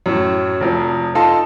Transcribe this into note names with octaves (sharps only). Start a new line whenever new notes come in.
F#2 A2
F1 F2
D#4 F4 A4 A5 C6